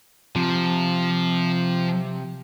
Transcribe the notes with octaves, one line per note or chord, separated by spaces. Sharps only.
C3 F3